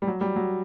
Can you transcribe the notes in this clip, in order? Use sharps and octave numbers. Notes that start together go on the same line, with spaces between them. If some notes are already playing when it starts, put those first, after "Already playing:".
G3
F#3
G3
F#3